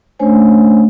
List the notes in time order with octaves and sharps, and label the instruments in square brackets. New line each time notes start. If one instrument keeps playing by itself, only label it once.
[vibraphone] A3 C#4 D4 C5 C#5 G#5